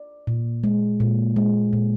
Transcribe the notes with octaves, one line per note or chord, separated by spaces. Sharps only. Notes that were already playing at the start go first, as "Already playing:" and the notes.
Already playing: D5
A#2
G#3
A#2
G#3
A#2